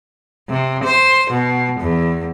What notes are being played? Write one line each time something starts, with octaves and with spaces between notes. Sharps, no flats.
C3
C5
B2
E2